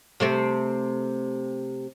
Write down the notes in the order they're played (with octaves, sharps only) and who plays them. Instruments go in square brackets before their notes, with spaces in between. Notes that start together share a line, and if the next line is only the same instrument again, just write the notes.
[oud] C3 A3 C4